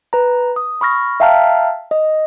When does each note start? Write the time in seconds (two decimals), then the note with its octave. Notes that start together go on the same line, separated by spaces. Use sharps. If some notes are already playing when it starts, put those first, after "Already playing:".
0.13 B4 A#5
0.56 D#6
0.81 B5 C#6 F6 A#6
1.20 E5 F5 G5 A5 A#5 F6
1.91 D#5